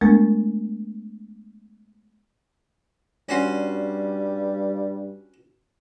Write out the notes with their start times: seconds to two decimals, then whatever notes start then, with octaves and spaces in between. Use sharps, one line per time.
0.01 G#3 A3 B3 D4 A#4
3.29 G2 G3 C#4 F#4 C6